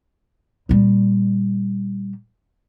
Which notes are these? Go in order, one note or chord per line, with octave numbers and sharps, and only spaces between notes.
A#2 G3